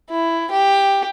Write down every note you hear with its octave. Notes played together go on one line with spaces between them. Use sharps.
E4
G4